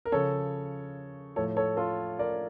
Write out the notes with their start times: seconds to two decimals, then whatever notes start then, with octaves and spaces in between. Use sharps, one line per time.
0.05 A#4
0.12 C#3 F3 A4 C#5
1.36 A2 F3 A4 C#5
1.57 A4 C#5
1.77 F4 A4
2.19 A#4 D5